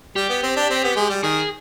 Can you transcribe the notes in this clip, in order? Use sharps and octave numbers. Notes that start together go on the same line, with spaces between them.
G3 G4
B3
C4
D4
C4
B3
G#3
G3
D#3 G#4